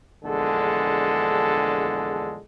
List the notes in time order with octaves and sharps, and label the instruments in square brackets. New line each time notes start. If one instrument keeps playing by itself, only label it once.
[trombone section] A#1 E2 D3 G#3 A4